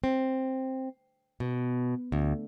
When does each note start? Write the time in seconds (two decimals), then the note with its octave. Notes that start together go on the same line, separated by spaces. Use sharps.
0.04 C4
1.40 B2
2.12 D2